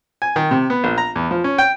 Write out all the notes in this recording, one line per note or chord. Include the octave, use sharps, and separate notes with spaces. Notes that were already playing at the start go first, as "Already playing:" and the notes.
G#5
D#3
C3
B3
A#1
A#5
E2
F3
C#4
G5